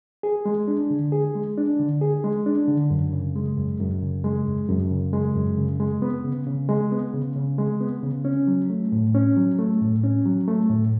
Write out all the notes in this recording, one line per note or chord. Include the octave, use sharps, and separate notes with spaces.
G#4
G#3
D4
D3
G#4
G#3
D4
D3
G#4
G#3
D4
D3
F#2
C#3
G#3
F#2
F#2
C#3
G#3
F#2
F#2
C#3
G#3
F#2
C#3
G#3
B3
C#3
C#3
G#3
B3
C#3
C#3
G#3
B3
C#3
C#4
F#3
A3
A2
C#4
F#3
A3
A2
C#4
F#3
A3
A2